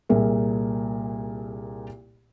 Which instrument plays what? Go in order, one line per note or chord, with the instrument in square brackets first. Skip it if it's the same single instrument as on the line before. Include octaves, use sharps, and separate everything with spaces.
[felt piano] C2 A#2 G#4 A#4 E5